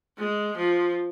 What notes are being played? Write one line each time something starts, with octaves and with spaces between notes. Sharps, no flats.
G#3
F3